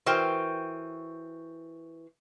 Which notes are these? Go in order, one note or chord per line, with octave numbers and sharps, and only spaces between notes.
E3 F#4 A#4 C5 G5